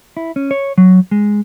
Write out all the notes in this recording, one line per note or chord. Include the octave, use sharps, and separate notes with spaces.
E4
C#4
C#5
F#3
G#3